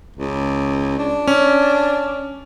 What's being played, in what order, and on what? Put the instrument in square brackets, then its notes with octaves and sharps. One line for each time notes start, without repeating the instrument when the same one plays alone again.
[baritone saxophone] C#2
D4
[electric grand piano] C#4